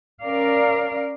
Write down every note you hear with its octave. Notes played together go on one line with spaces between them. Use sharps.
C#4 A#4 D5 F5